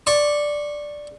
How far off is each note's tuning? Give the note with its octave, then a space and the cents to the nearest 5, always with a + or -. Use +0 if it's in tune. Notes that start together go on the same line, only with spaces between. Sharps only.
D5 +0 C#6 -20